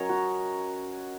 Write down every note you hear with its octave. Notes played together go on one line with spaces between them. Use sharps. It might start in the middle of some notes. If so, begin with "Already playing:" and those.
Already playing: F#3 C#4 A#4 C#5 D#5
F#4